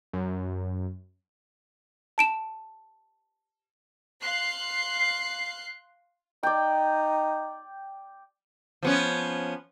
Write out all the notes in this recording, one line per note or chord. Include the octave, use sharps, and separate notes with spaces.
F#2
A5 D7 E7
F5 C6 F#6 C7
D#4 D5 G5
F3 B3 C#4